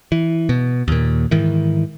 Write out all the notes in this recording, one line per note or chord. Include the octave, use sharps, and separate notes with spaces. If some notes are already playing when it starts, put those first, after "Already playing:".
E3
B2
D#2 A#2
G#2 D#3 E3